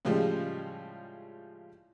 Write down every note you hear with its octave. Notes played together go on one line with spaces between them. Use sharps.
A2 C#3 F3 G3 G#3